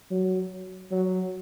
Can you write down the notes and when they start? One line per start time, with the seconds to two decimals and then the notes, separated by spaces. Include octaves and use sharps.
0.11 F#3
0.91 F#3